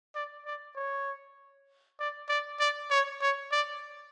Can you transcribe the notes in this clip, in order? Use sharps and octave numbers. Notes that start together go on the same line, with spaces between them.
D5
D5
C#5
D5
D5
D5
C#5
C#5
D5